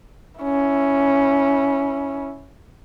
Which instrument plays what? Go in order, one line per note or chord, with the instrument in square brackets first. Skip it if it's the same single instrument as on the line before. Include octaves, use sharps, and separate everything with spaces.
[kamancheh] C#4 E4